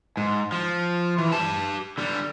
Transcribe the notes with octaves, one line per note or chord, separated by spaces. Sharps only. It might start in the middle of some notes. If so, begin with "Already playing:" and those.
G#2
F3
E3
G4 A5
D3 G3